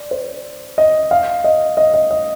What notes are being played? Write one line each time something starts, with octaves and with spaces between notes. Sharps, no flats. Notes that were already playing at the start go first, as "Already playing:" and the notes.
Already playing: D5
C5
D#5
F5
D#5
D#5
D#5
D#5